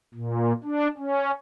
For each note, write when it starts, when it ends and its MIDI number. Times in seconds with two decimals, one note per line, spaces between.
0.14 0.52 46
0.64 0.88 62
0.98 1.31 61